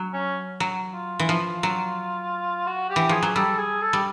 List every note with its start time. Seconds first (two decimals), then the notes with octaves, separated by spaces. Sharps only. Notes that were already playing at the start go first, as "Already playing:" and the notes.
Already playing: F#3
0.14 C#4
0.60 F#3
0.95 F4
1.19 E3
1.29 F3
1.63 F#3
2.67 F#4
2.90 G4
2.96 E3
3.09 F3 G#4
3.23 F#3
3.35 G3 A4
3.58 G#4
3.82 A4
3.93 G3